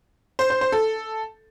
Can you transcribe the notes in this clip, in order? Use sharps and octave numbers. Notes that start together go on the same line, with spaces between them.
C5
C5
C5
A4